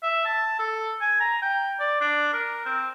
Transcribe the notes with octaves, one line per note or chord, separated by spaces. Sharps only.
E5
A5
A4
G#5
A#5
G5
D5
D4
A#4
C4